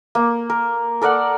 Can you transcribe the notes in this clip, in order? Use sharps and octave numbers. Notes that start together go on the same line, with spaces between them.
A#3
A#4
A4 A#4 D5 F#5